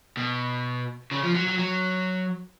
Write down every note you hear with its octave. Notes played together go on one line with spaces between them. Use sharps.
B2
C#3
F3
F#3
F#3
F#3